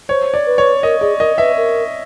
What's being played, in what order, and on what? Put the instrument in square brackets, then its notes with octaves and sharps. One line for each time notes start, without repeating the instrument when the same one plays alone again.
[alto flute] C5 [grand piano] C#5
[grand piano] D5
[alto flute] B4
[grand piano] C#5
[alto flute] A#4 [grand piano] D#5
[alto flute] G#4 [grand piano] D5
[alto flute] A#4 [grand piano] D#5
[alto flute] B4 [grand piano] E5
[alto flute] A#4